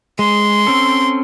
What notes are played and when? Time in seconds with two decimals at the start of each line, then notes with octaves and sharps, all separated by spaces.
0.19 G#3 C6
0.67 C4 C#4 A4